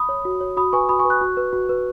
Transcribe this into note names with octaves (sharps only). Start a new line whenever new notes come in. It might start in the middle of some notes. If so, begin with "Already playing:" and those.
Already playing: B5 D#6
C#5
F#4
C#5
F#4 B5 D#6
B4 G#5 C#6
F#4 B5 D#6
G#5 C#6
B4
C#6 F#6
F#4
B4
F#4
B4